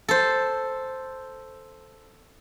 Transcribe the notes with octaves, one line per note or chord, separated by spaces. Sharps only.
A4 C5